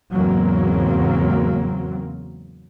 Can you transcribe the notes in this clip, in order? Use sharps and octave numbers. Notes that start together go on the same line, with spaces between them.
E2 G#2 C#3 F#3 A#3 C4